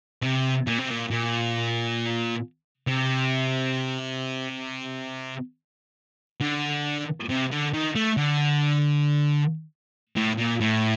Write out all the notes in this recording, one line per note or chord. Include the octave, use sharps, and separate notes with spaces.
C3
A#2
C3
A#2
A#2
C3
D3
C3
D3
D#3
A3
D3
A2
A#2
A2